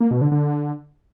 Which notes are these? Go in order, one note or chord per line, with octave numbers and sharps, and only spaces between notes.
A#3
B2
D3
D3